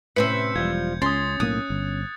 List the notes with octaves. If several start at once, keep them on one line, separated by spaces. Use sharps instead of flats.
A2 C3 C#4 B4 C5 E5 G6 C#7
E1 F3 G3 G#6
C#2 C#4 C6 D#6 A6
B1 A2 A#3 D#6 F#6
G1